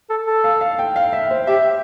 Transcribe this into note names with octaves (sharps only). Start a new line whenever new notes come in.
A4
A4
F5
F5
G5
F5
E5
C5
G4 E5